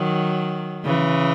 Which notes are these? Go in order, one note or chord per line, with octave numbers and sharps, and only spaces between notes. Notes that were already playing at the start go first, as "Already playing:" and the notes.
Already playing: D#3 F#3
C#3 E3